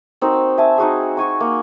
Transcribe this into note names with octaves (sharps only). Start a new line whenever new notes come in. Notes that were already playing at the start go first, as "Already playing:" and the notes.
C4 D#4 F#4 A#4
E5 G#5 A5
D#4 F#4 G#4
F#4 G#5 C#6
A#3